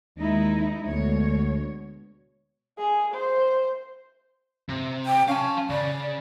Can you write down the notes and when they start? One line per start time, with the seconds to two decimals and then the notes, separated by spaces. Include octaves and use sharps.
0.17 D#2 G#3 D#4 E4
0.86 D2 B2 G#3 C#5
2.78 G#4
3.14 C5
4.69 C3
5.06 G5
5.28 C#4 F5 A5
5.70 C#3 D5